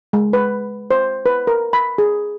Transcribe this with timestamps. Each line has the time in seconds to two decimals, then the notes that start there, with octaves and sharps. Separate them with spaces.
0.13 G#3
0.33 B4
0.91 C5
1.26 B4
1.47 A#4
1.73 B5
1.98 G#4